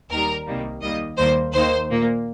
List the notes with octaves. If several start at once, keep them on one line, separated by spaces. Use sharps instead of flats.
D#2 D#3 G3 A#4
C2 C3 D#3 G3 A#3
D#2 D#3 G3 A#3 D#5
D#2 D#3 G3 A#3 C5
D#2 D#3 A#3 C5
A#2 A#3